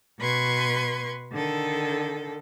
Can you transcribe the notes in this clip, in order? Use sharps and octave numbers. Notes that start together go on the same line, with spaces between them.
B2 B4 C6 C#6 G#6
D3 D#3 A4